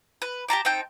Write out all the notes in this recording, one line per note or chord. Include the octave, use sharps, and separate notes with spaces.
B4
G4 A5 A#5 D6
C4 D#4 G5 A5